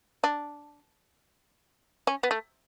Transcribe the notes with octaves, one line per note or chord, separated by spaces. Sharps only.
D4
C#4
B3
A3